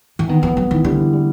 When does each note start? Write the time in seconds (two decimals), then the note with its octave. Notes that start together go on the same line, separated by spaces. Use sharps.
0.19 E3
0.28 D#3 B3
0.43 E3 B3
0.56 F#3 B3
0.71 D#3 E3
0.84 D3 G3
0.98 E3
1.13 G3